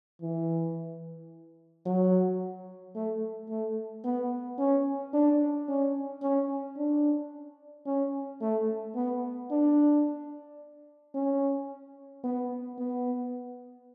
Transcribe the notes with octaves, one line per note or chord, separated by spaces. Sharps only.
E3
F#3
A3
A3
B3
C#4
D4
C#4
C#4
D4
C#4
A3
B3
D4
C#4
B3
B3